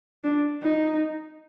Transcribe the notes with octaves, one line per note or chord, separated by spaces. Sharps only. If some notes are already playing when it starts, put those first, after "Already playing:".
D4
D#4